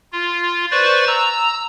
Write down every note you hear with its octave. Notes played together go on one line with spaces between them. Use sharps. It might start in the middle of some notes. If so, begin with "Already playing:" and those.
F4
B4 C5 D5 C#6 A6
A#5 E6